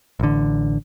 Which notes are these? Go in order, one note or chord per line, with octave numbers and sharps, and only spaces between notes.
A1 D3